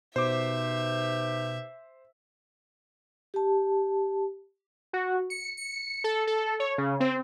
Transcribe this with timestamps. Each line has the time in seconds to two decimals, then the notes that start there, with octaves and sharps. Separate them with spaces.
0.16 B2 B3 D#4 G4 C5 E5 D6
3.34 G4 A5
4.93 F#4
5.30 C#7
5.57 C#7
6.04 A4
6.27 A4
6.60 C#5
6.78 C#3
7.00 C4